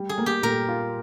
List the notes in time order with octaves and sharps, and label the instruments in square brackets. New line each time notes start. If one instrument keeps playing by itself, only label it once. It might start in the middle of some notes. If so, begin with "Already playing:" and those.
Already playing: [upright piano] G3
[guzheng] G#4
[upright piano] A#3
[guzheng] G4
[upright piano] A#2 [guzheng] A#4
[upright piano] F4